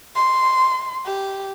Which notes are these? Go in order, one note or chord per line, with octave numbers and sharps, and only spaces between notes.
C6
G4